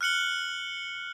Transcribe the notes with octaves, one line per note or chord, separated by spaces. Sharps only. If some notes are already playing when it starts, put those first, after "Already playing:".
F6 F#6 C#7 F#7 G7